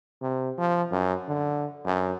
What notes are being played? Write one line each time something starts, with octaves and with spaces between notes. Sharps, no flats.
C3
F3
F#2
D3
F#2